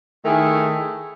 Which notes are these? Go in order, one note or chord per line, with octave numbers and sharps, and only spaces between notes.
D#3 A3 E4 G#4